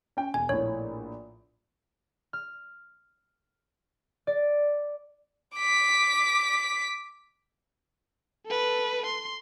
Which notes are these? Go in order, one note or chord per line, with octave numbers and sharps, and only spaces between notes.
C#4 G5
E1 G#5
A#1 A2 C#5
F6
D5
D6 B6
A4 B4
C6